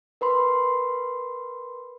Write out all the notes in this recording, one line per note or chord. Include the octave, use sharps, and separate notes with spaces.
A#4 B4 B5 C6